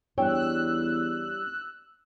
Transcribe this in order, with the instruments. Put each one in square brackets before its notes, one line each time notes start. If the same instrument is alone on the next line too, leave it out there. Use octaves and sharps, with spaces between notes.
[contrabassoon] E2 [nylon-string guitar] G3 D4 C#5 [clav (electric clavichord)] G5 [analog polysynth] E6 F#6